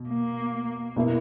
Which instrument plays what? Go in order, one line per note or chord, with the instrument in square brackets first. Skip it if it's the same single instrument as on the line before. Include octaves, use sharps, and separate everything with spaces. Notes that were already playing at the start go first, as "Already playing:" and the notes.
Already playing: [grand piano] B2
[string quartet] A#3
[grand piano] B2 A#3 E4